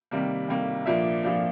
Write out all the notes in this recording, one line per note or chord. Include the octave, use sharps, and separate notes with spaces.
C3 D#3 G3 A#3
C3 D#3 G3 A#3
A#2 F3 A#3 D4 E5
A#2 F3 A#3 D4